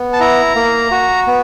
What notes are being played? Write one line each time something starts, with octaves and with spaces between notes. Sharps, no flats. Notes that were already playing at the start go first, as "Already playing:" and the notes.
Already playing: B3
A5
E4 A#5
A#3
F#4
B3